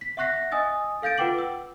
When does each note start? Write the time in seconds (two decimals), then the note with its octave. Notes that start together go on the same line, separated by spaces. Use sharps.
0.01 B6
0.17 E5 F#5 C#6 F#6 A#6 C7
0.51 D#5 G#5 D#6 E6 A6
1.02 A4 F5 G6 A6 D7
1.18 F4 B4 F#5 G5 D6 F#7
1.38 E6